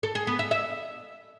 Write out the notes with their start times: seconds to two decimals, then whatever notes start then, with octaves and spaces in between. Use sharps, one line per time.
0.03 A4
0.15 G#4
0.27 B3
0.39 E5
0.51 E5